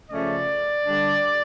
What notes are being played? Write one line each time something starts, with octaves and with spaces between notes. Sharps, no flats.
C#3 F3 A3 C#4 D5
D3 G3 D4